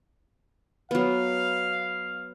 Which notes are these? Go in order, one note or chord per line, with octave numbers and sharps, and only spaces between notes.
F#3 B3 F5